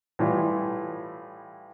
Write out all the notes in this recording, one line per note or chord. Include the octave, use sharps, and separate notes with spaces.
A2 E3 G3 F4